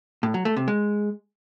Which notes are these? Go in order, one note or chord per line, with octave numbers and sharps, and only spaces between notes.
A2
F#3
A3
C3
G#3